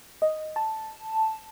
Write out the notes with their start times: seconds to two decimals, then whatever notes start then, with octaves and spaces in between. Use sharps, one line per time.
0.22 D#5
0.56 A5